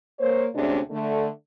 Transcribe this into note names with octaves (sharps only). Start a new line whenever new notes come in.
A#3 C5 C#5
D2 C3 G#3 A3 C#4 D4
D3 A3